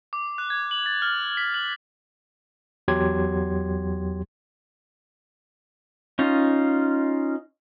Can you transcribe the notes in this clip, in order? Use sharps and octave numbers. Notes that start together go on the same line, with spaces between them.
D6
F#6
G#6
F#7
A6
F6
B6
F#7
E2 F#3 G4 C6 G#6
C#4 D#4 F4